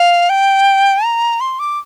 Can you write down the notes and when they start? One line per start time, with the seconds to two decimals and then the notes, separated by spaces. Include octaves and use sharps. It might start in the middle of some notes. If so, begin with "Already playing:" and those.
Already playing: F5
0.30 G5
1.05 A#5
1.41 C6
1.59 D6